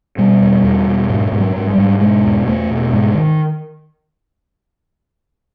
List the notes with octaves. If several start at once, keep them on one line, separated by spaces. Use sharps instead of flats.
B2 G3
E2
E2
B2
G#2 F#3
G#2
F#3
G#2
G3
G#2
B2 G#3
E2
E2 A3
B2
G#2 G#3
D#3